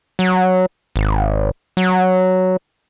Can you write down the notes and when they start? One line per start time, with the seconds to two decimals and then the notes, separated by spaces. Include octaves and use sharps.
0.19 F#3
0.96 G#1
1.77 F#3